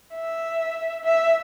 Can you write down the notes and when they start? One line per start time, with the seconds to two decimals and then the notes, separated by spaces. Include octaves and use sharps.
0.14 E5
1.04 E5